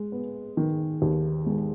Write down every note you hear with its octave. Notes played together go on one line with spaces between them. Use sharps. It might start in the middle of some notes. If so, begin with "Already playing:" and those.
Already playing: G#3
B3
D#3
D#2
G#3